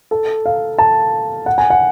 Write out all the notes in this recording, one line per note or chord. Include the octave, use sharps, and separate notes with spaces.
A4
F5
A5
F#5
G#5
F#5